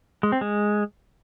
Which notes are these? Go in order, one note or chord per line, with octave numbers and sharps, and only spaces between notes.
G#3
C4
G#3